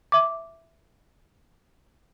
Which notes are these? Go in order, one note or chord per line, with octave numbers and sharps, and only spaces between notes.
E5 D6